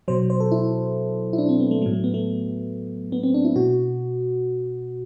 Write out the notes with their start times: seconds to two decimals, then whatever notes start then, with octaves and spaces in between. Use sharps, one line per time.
0.08 B2 F#3 C5
0.30 C5
0.40 A4
0.51 E4
1.33 E4
1.38 D4
1.49 C4
1.60 B3
1.71 A3
1.82 F#3 A3
1.86 A2
1.93 A3
2.04 B3
2.14 A3
3.12 B3
3.23 C4
3.34 D4
3.45 E4
3.56 B2 F#4